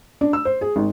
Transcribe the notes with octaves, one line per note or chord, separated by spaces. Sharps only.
D4
E6
C5
G#4
G#1